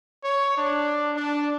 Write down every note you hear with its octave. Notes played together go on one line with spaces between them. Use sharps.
C#5
D4
D4